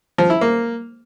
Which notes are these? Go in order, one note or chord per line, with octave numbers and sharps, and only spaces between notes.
F3
E4
A#3